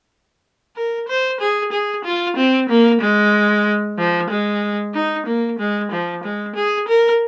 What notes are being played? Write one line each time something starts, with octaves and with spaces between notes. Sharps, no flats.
A#4
C5
G#4
G#4
F4
C4
A#3
G#3
F3
G#3
D#4
A#3
G#3
F3
G#3
G#4
A#4